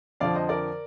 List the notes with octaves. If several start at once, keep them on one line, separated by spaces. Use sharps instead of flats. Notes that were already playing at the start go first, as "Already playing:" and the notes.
F2 D3 F3 D5 F5
C5 D#5
A#4 D5